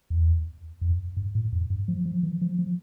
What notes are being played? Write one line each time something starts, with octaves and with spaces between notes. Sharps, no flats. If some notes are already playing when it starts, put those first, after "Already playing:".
E2
F2
G2
A2
F2
G2
F3
F3
E3
F3
F3